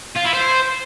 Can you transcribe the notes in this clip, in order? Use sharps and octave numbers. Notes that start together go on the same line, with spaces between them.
F4
E4
C5